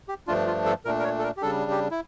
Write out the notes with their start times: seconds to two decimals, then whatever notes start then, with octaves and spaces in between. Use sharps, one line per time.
0.08 G4
0.27 G2 F3 A3 D4 F4
0.47 F4
0.66 A4
0.85 A#2 A3 D4 A#4
1.00 A#4
1.04 C#5
1.19 A4
1.23 A#4
1.37 G4
1.42 C#3 G3 D4 A4
1.71 G4
1.91 E4